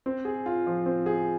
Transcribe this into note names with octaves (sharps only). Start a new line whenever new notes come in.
C4
G#4
F4
F3
C4
G#4